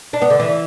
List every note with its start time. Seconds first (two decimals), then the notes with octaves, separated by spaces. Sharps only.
0.13 D4
0.22 B3
0.30 D3
0.40 E3